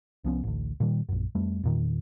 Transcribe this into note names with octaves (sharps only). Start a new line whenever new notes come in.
C2 F3 B3 C#4
A1 D2
A#2 D#3 G3
A#1 F#2
F2 G3 A3
E2 A#2 D#3